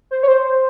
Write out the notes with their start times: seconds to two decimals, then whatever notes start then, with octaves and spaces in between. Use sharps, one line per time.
0.11 C5
0.23 C#5
0.28 C5